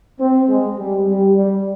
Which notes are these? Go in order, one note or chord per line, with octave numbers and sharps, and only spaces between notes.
C4
G#3
G3
G3
G3